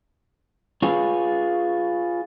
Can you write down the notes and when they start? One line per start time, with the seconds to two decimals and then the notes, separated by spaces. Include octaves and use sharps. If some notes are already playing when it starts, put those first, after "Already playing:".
0.82 F4 G#4 B4 C#5